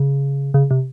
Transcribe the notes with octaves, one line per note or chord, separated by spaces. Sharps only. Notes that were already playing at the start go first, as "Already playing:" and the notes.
Already playing: C#3
C#3
C3